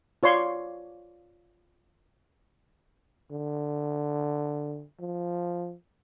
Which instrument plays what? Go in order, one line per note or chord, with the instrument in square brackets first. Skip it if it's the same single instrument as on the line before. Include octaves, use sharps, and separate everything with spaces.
[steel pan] F4 C#5 D5 C6
[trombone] D3
F3